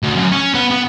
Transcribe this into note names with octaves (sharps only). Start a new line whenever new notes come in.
D2
F#2
C#4
B3
B3